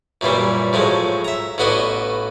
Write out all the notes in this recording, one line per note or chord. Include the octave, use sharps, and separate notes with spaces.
F#2 A#2 E3 G3
A2 F3 F#3 G#3
E5 A#5
A1 A2 B3 F#4 D5 D#5